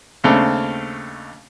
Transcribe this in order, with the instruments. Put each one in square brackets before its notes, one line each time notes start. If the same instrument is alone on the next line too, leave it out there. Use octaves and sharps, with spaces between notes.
[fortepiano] D#2 C#3 A3 C4 D4